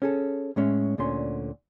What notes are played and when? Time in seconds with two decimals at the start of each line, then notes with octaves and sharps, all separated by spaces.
0.02 C#4 G#4 A4
0.56 A2 G#3 C#4 E5
0.98 D2 A#2 D3 C#4 C6